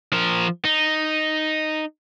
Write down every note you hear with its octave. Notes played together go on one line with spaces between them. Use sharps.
F3 A#4
D#4